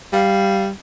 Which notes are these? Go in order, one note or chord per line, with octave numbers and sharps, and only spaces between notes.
G3 F5